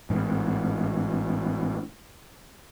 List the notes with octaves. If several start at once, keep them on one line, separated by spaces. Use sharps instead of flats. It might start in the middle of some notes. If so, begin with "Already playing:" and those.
A1 G#2